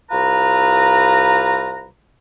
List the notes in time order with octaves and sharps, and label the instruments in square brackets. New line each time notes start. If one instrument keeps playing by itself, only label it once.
[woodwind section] C2 F4 B4 A#5